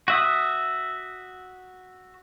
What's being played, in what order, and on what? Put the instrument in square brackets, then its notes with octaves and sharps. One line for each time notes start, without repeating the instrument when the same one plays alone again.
[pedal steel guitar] F#4 E5 D#6